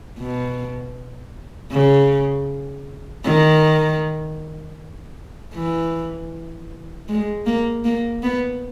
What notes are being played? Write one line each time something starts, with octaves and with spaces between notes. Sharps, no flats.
B2
C#3
D#3
E3
G#3
A#3
A#3
B3